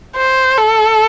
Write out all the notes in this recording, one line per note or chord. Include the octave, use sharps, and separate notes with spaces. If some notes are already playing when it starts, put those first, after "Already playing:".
C5
A4